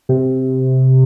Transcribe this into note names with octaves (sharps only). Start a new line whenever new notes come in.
C3